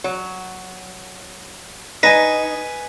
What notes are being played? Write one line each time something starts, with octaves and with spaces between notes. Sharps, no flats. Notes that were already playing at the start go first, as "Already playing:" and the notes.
F#3
D#4 B4 G#5 A#6